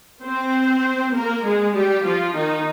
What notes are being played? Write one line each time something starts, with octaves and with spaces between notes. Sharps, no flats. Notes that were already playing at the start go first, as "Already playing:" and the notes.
C4 C5
A#3 A#4
G#3 G#4
G3 G4
F3 F4
D#3 D#4